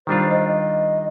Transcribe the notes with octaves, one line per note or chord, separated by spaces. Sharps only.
D#3 G3 D4 F4 C5
D#5
D#5